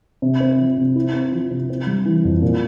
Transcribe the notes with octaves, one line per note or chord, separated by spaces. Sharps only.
C3
C4
F3
C3
E4
C4
F3
C3
C4
G3
E3
F2
A#2